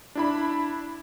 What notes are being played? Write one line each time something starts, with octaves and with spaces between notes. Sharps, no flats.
D4 E4 B5